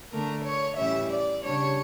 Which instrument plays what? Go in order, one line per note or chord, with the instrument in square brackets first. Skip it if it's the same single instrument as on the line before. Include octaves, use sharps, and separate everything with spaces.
[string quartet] D3 A3 D4 A#4
C#5
A2 E3 G3 C#4 E5
D5
C#3 G3 D4 C#5